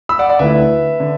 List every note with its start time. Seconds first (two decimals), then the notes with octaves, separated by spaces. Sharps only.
0.09 B5 E6
0.19 D5 F#5
0.29 D5 F#5
0.39 D2 D3 A3 E4 B4 E5
1.00 D3